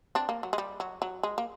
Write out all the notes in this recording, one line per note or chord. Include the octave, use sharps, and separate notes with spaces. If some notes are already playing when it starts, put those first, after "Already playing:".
C4 D4
A#3
F#3
G#3
G3
F#3
F#3
G#3
A#3